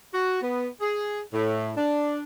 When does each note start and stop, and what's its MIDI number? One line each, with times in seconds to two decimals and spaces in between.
0.14 0.40 66
0.42 0.68 59
0.81 1.20 68
1.33 1.72 45
1.77 2.21 62